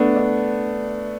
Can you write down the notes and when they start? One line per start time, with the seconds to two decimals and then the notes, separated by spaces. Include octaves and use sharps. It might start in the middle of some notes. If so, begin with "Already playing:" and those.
Already playing: A3 B3 D4
0.16 D4